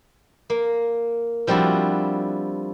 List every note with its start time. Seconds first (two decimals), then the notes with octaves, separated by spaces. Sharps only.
0.50 A#3
1.47 F3 G3 C4 D4 E4 F#4